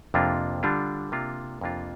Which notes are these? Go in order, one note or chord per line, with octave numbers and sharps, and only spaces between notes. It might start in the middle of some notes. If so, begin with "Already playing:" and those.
F2 C3 A#3 D4 F4
D3 G3 D4 F4
C3 A#3 D4 F4
F2 C3 A#3 D4 F4